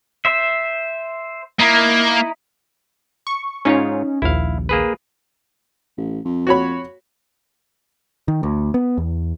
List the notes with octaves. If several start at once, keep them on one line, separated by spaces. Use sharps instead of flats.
C5 E5
A#3 D#4 E4
C#6
G#2 C#4 D#4 F4 C#5
A#1 D#2 E4 F5
A#3 G#4 B4
A1
F2
F#4 C#5 B5
D#3
D2
B3
E2